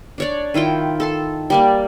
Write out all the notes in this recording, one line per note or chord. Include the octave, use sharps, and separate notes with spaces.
D4 C#5 D5
D#3 E4 F4 G5
A4 A5 C6
G3 A#3 D5